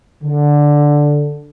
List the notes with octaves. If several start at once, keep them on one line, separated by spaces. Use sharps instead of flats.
D3